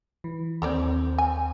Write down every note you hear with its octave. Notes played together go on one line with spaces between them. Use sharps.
E3
D#2 C4 A4 C#5 D5
G#5